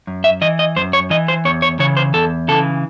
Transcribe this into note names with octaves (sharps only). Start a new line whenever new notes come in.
F#2
E5
E3 D#5
D#5
F#2 C5
C#5
E3 D#5
C5
E2 C#5
C#5
C#3 E3 C#5
C5
E2 A4
C#3 E3 A4